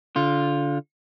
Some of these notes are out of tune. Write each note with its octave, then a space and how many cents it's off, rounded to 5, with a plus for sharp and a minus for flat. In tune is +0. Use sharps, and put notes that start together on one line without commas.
D3 -25 F4 +0